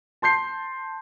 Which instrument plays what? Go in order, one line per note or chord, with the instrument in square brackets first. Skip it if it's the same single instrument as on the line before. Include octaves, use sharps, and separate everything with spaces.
[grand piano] A5 C6 G6 C7